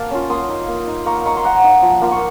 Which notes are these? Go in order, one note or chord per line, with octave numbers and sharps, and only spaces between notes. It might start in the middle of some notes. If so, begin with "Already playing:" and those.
Already playing: A#3 F5 A5
C#4 F4
A#3 C6 D#6
D#4
A#3
D#4
A#3 A#5 C#6
D#4 A#5 C#6
C6
A#3 F#5 A#5
D#4
F3
A#3 F4
C#6